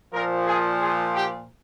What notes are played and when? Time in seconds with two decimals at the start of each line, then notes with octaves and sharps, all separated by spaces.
0.13 A#2 F3 A#4
0.46 G#4
0.81 G#4
1.14 G4